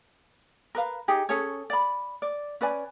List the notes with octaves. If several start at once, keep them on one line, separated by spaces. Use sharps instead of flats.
A#4 B4 F5
D#4 G4 G#4
C#4 G#4 A4 C#5
D5 B5
D5
C#4 B4 D5 G#5